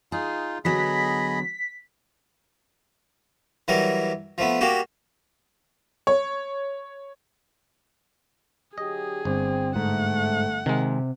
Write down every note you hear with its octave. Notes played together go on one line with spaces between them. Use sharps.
D#4 F4 G#4
D3 F#3 B3 G#4 D#5 B5 B6
E3 F#3 G3 A#4
F3 A3 B3
G3 A#3 F#4 G4
C#5
D3 F#3 G4 G#4 D#5
G1 C4
G#2 A3 F#5
C3 D#3 G#3